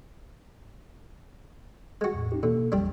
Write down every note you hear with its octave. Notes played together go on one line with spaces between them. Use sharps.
G#3 F#4
E2 A2
C#4 D#4 G4
B2 D3 A#3 A4
A1 E2 F3 G3 D4